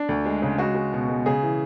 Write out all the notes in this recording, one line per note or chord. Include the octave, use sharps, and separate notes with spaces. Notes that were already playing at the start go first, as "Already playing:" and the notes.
Already playing: D4
D2
G#3
C#3
G#3 F#4
G#3
B2
G#3
C#3 G#4
E3